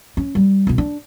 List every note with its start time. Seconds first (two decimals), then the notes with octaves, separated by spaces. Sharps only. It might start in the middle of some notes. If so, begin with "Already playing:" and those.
0.17 C#4
0.35 G3
0.67 B1 F4
0.78 D4